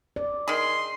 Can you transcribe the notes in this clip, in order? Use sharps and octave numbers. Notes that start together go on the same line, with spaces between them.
D5
D#3 G#4 C6